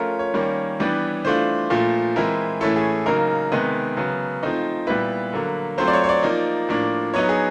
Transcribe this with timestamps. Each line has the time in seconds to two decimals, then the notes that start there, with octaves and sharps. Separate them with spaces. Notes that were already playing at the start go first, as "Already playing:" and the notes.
Already playing: F3 A3 C#4 F4 A#4
0.19 C#5
0.34 D#3 G3 A#3 C#4
0.80 E3 G3 B3 D4
1.25 E3 A3 D4 F4 C5
1.70 A#2 F3 A3
2.16 E3 G#3 C4 E4 A#4
2.60 A2 E3 A3 C#4 E4 A4
2.76 G#4
3.06 C#3 F#3 A#3 D#4 A#4
3.52 C3 D#3 G#3 B3
3.97 C#3 F#3 B3
4.43 F3 A3 C4 D#4
4.87 A#2 G3 B3 E4 B4
5.33 D3 F#3 A#3
5.78 F#3 A3 C4 F4 C5
5.88 D5
5.93 C#5
6.04 C#5
6.09 D5
6.23 F3 A#3 D#4
6.69 A2 F3 A#3 D4
7.14 F#3 B3 D#4 C#5
7.29 G#4